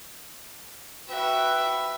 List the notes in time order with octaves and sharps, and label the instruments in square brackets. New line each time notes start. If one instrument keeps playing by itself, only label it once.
[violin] F#4 G5 [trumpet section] B4 [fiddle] E5